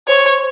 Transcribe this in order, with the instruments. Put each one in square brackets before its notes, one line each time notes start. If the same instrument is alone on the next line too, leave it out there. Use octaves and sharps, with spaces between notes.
[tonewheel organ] C5 [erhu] C#5